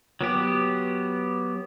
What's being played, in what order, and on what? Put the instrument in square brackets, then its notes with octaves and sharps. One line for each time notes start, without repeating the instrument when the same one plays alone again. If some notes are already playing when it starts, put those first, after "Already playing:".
[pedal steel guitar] F#3 B3 G4